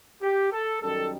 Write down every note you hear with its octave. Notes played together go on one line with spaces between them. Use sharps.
G4
A4
F#2 D#3 G3 A4